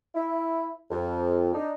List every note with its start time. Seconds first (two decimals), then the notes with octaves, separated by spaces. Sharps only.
0.15 E4
0.91 F2
1.53 D4 D#4